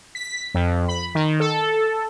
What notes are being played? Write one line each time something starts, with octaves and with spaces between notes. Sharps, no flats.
B6
F2
B5
D#3
A4